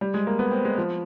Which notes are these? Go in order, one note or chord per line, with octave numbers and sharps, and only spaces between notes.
G3
G#3
A#3
B3
C4
G#3
F3